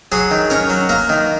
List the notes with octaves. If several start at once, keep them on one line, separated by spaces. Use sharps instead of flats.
F#3 G#4
D#3
C#4 A#4
F#3
A#3 A#4
D#3